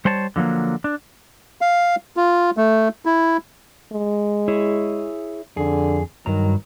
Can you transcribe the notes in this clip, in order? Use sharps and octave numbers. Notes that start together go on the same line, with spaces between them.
G3 C5 C#5 A5
D3 F3 F#3 A#3
D4
F5
F4
A3
E4
G#3
E4 G#4 C#5
F2 D3 G#4
G2 D#3 F#3 A#5